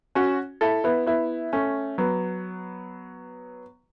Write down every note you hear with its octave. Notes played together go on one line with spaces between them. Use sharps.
C#4 F#4
E4 A4
B3 E4
B3 E4
A3 C#4
F#3 B3